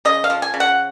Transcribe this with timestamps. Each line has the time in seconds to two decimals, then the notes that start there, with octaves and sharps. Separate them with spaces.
0.05 C#3 D#5
0.24 F5
0.30 F3
0.42 G#5
0.54 C#3
0.60 F#5